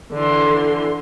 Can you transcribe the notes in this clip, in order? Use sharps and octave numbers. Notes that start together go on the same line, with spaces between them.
D3 E3 C6